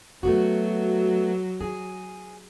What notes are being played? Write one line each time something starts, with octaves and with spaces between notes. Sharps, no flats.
F#3 A3 B3 F#4
G#4